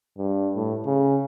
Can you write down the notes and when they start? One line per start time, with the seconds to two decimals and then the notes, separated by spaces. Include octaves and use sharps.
0.18 G2
0.56 A2
0.86 C#3